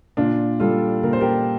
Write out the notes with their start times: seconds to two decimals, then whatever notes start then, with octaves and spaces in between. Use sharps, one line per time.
0.17 A#2 D4 F4
0.60 G3 F4 A4
1.03 A#2 A#4
1.13 C5
1.21 G4 A#4